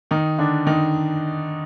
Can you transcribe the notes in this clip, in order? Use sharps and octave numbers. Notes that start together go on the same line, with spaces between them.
D#3 D#4
D3 D4
D#3 D#4